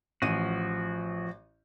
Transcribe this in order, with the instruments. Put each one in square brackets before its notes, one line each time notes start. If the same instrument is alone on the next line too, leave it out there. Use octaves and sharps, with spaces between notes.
[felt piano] A1 D#7 [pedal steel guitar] F3 F#4